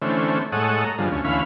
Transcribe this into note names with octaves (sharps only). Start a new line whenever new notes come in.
D3 E3 A3 C4 C#4
A2 G#3 A4 C#5 F#5 D#6
A#5
G2 D3 F3 G#3
D2 C#4
D2 E3 C#4 F5 B5